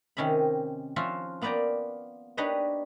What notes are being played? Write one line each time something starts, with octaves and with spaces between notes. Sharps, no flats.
C3 D#3 C#4 D#5 B5
F3 C#4 F4 F#4 E5
A#3 B3 B4 D5 G5 A#5
D4 D#4 G4 B4 C#5 D#5